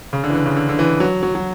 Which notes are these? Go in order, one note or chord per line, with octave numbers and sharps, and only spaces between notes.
C#3
D3
E3
D3
C#3
D3
D3
E3
F#3
F#3
F#3